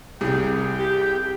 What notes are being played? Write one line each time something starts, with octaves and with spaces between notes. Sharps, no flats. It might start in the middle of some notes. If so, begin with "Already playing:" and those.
C2 C3 G3 G#4 G5
G4